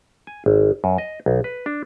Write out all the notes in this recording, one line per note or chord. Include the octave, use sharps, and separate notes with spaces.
G#5
G#1
F#2
D#5
B1
B4
D4